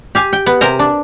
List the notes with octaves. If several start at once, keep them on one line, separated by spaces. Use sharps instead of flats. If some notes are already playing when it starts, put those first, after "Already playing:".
G4 F5 G#5
G5
B3
C3 A#4 C5 G#5 A#5
D4